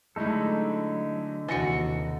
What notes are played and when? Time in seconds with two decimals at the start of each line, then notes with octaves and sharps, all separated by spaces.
0.16 D3 F#3 G#3 A3 D#4 E4 A4
1.48 D#2 C3 E3 F#4 A6 A#6 C#7